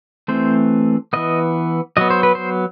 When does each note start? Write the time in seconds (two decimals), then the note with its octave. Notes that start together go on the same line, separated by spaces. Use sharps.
0.28 E3 A3 C4 C5
1.13 E3 B3 D#5
1.97 F#3 B3 D#5
2.10 C5
2.23 B4
2.35 C5